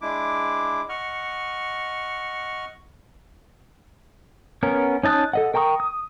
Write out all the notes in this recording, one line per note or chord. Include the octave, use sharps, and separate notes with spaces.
G#3 D4 E4 D6
D#5 F#5 C#6 F6
B3 C#4 A#4
C#4 D#4 A5 D#6 F#6
A4 D#5 F#5
A#4 G5 A#5 C#6 D#6
D#6